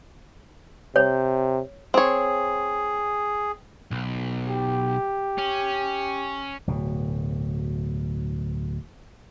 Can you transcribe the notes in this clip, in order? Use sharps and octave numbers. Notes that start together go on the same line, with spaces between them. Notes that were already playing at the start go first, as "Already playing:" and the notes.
C3 C#5
C4 G#4 C#5
B1
G4
C#4
D1 B2